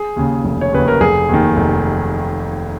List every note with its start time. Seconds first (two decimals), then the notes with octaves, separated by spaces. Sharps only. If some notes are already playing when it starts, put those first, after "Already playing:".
Already playing: G#4
0.16 D#2 C#3
0.45 F1
0.61 C#5
0.73 D#2 C#3 B4
0.88 A#4
1.01 F1 G#4
1.29 D#2 D#3
1.57 F1